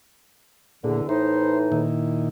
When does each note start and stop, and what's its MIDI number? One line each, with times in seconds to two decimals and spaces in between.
0.84 1.07 40
0.84 1.01 46
0.84 1.07 50
1.09 1.84 45
1.09 1.84 52
1.09 1.84 63
1.09 1.59 72
1.72 2.29 46
1.72 2.29 51
1.72 2.29 64